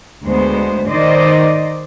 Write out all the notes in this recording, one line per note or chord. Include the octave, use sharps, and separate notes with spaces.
D2 G#3 B3 C5
D#3 C5 D5 D#5